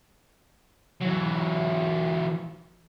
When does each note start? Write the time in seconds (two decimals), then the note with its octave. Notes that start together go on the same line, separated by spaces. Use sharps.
1.01 E3 F#3